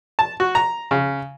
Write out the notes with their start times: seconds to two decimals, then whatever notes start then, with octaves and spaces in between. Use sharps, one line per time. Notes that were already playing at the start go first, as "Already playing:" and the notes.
0.19 A5
0.40 F#4
0.55 A#5
0.91 C#3